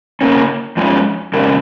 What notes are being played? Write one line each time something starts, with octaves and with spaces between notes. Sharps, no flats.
C#3 A#3 C#4
F2 F3 G#3 C#4
F2 C#3 G#3 C#4 A#4